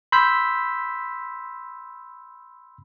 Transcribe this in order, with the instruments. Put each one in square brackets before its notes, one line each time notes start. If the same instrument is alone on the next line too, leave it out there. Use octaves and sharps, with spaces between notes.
[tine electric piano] B5 C6 E6 G6 B6